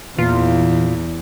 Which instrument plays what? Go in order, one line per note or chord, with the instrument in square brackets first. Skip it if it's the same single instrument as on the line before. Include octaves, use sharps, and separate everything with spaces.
[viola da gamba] E2 [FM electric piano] A#2 [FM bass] E3 [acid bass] F4